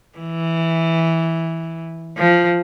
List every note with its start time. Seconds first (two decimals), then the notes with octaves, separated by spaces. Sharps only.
0.18 E3
2.17 F3